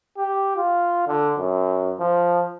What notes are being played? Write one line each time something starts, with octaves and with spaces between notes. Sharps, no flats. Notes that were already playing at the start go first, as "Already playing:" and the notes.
G4
F4
D3
F#2
F3